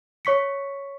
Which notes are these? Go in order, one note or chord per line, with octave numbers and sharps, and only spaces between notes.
C#5 C#6 B6 C#7